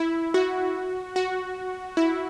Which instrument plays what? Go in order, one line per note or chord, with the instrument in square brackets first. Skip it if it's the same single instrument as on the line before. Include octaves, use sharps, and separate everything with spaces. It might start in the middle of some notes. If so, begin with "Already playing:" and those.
Already playing: [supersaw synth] E4
F#4
F#4
E4